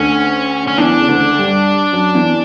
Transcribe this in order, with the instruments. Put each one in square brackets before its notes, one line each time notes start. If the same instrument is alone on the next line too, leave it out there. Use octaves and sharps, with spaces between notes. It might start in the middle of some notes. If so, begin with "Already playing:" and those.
Already playing: [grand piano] D2 D3 [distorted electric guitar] C#4
[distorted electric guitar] C#4
[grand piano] E2 E3 [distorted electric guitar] D4
[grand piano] C#3
D2 D3
A3
G2 G3
F#2 F#3
E2 E3